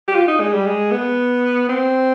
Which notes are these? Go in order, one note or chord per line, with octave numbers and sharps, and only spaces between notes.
G4
F4
D#4
G#3
G3
G#3
B3
C4